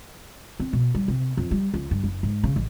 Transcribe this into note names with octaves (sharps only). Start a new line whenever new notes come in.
C4
B2
G3
C3
F2
G3
C#2
G2
F#1
G#2
C#3
A1